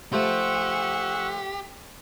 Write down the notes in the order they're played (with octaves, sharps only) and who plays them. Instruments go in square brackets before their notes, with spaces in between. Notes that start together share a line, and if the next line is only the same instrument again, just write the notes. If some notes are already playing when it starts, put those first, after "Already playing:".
[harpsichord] F3 A3 C5 [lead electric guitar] G4 [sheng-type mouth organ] F#5 C#6 E6